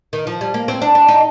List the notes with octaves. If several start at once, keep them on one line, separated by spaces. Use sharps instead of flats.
D#3
F3
G3
A#3
C4
D4
D4
D#4